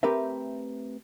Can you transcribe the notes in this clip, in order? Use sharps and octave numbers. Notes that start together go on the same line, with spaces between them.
A3 C4 G4 A#4 B4 E5